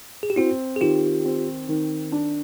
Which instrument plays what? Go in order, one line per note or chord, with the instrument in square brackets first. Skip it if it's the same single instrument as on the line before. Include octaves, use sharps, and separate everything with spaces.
[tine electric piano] G#4
G4
[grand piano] C4 [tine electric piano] E4 F#4
[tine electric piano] G#4
[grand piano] D#3 [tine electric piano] F4 G4
[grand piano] C4
D#3
D4